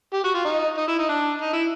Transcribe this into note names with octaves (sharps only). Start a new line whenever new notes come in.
G4
F#4
F4
D#4
D#4
E4
D#4
D4
D#4
E4